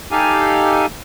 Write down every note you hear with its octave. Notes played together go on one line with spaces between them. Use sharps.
D#4 G4 A4 F5 G#5